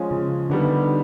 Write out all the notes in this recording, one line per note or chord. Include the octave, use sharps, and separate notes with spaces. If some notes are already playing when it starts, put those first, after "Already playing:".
Already playing: F3 G#3 C#4 F4
C#3
D3 D#3 G3 B3 D4